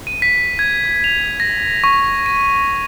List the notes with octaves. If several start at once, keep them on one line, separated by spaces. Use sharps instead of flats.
D#7
B6
G#6
F7
A#6
C#6
D#7